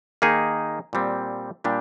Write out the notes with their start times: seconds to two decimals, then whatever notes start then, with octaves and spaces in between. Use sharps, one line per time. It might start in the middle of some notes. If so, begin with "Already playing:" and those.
0.22 D#3 A#3 D#4 G#4
0.93 A#2 G3 C4
1.64 A#2 G3 D4 G4